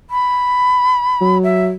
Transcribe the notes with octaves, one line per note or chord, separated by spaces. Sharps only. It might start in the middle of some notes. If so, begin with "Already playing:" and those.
B5
F#3
E5